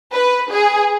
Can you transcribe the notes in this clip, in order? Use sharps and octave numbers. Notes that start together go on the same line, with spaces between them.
B4
G#4